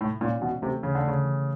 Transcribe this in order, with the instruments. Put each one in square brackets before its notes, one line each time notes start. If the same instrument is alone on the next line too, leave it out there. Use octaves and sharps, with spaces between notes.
[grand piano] A2 [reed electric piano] C3
[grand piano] A#2 [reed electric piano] C#4
[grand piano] B2 [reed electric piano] E3
[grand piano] C3 [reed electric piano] A3
[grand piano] C#3 [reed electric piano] E3
[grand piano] D3
[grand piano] C#3 [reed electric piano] A3
[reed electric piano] E3